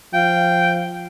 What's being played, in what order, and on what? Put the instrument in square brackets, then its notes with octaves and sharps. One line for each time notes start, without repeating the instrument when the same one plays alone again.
[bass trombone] F3 [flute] F5 [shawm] G5